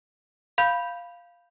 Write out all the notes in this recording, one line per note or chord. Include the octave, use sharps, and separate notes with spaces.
F5 B5 G6